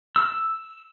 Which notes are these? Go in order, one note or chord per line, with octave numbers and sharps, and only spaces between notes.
E6